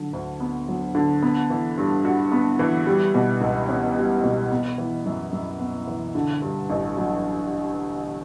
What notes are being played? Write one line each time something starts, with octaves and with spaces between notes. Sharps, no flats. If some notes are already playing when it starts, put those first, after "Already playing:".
Already playing: D3 F#3
D2
B3
F#3
D3
B3
E3
G2
F#4
B3
E3
G3
B2
C#2
C#4
G3
B2
B3
E3
F#2
F#2
B3
E3
D3
G2
A1
F#3